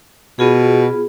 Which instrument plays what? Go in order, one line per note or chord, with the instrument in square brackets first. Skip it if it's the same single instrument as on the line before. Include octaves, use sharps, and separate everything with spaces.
[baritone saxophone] B2 [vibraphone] B3 F4 G#4